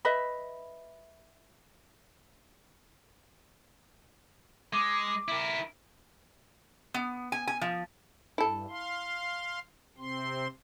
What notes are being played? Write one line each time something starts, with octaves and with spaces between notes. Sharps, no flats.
B4 D#5 E5 B5
G#3 D6
E4 A#4
B3
G#5
G#5
F3
G2 E4 A4
F5 C6
C3 C4 C6